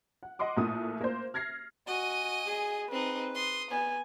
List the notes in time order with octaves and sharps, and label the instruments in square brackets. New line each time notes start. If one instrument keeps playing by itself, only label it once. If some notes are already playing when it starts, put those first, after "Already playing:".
[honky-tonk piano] F#5
D#5 F#5 C6 D6
A#1 A2 A3 A#3 D#6
A#3 C5
F6 G#6 A#6 C7
[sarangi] F#4 [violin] D#5 G#5
[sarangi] G#4
[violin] C4 D#4 [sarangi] B4
[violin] C6 D#6
[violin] B3 [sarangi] G#5